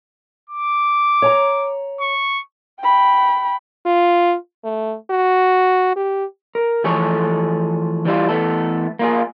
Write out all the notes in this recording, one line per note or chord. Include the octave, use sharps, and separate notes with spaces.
D6
C#5 G#5 A#5
C#6
G5 B5
F4
A3
F#4
G4
A#4
E3 F3 A3 G#4 A4 C#5
E3 G3 E4 F4
E3 A3 B3 A4
A#3 F4 G#4